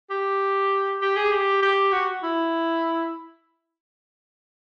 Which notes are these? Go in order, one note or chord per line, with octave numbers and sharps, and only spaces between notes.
G4
G4
G#4
G4
G4
F#4
E4